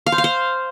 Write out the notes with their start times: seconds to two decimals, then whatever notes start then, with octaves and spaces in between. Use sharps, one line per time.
0.06 F5
0.12 C5
0.18 F5
0.24 C5